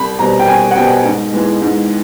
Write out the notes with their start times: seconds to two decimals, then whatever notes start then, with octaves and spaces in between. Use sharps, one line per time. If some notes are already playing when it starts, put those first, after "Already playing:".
Already playing: C2 B5
0.19 B2 G3 C4 A#5
0.39 G5
0.47 C2 G#5
0.71 F#5
0.76 B2 G3 C4 G5
1.05 G#2
1.33 E3 G#3 B3
1.62 G#2